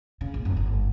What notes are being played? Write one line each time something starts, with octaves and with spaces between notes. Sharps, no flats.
C#3
A#1
F#1
G1